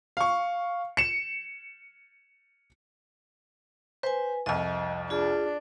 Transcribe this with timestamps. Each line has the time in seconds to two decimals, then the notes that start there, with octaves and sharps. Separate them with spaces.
0.17 F5 C#6
0.97 C#7 E7
4.03 B4 C5 G#5
4.46 C2 F2 D#5
5.10 D4 F4 G#4